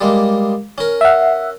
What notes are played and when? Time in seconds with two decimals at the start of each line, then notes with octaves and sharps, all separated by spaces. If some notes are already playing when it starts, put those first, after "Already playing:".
0.01 G3 G#3 A#3
0.78 C#4 A#4
1.01 E5 F#5